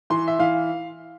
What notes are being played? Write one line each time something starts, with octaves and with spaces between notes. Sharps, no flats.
E3 C6
E5
E3 F5